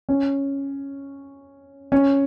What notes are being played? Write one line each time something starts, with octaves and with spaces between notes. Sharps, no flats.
C#4
C#4